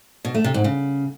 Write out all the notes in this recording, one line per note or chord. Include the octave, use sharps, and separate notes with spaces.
B2
A3
C3
G#2
C#3